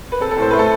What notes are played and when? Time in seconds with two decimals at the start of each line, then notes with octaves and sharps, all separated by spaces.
0.12 B4
0.20 C4 A4
0.31 A4
0.37 A2 C5
0.51 A3 B4
0.59 A4